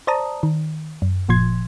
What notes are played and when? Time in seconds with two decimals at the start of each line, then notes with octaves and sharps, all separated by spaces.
0.07 C5 D5 A5 A#5 D#6
0.43 D#3
1.02 F#2
1.29 G1 A#2 F3 C6 G#6